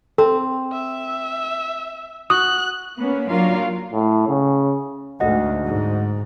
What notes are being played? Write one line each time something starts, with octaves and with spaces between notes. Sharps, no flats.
C4 A4
E5
F#4 D#6 F#6
A#3 B3 C#4
F#3 A#3 D4 F4 A#4 F5
A2
C#3
D2 G#2 F#4 D#5 F#5
G#2